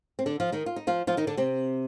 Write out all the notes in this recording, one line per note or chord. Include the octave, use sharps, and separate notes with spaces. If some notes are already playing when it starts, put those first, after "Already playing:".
C4
D3 D4
F3 F4
D#3 D#4
F4
D#4
F3 F4
F3 F4
D#3 D#4
D3 D4
C3 C4